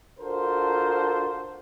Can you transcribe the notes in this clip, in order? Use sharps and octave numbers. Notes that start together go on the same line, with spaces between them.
D4 F4 F#4 A4 A#4 C5